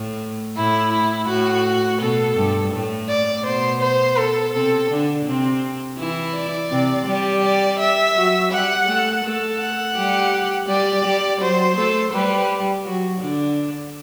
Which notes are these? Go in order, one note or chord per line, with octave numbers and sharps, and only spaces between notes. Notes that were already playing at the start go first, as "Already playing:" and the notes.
Already playing: A2 A3
A2 A3 E4
E4
A2 A3 F#4
B2 B3 A4
G2 G3
A2 A3
D5
B2 B3 C5
C5
A4
C3 C4 A4
D3 D4
C3 C4
E3 E4
D5
C3 C4
G3 G4
D5
E5
F#3 F#4
G3 G4 F#5
A3 A4
A3 A4
F#5
G3 G4
G3 G4 D5
G3 G4
F#3 F#4 C5
A3 A4
G3 G4 B4
F#3 F#4
D3 D4